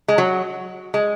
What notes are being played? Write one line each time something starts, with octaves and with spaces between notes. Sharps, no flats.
G#3
F#3
G#3